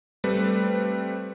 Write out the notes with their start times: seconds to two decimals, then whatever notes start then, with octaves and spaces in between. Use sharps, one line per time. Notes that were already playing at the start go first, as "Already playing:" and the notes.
0.24 G3 A3 C4 B4